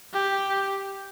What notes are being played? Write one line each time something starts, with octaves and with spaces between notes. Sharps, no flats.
G4